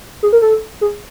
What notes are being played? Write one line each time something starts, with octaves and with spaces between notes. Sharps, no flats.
G#4
A#4
A4
G#4